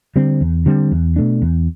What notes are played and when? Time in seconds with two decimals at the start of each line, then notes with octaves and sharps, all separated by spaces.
0.16 D3 G3 C4
0.41 E2
0.66 D3 G3 C4
0.92 E2
1.16 B2 A3 D4
1.42 E2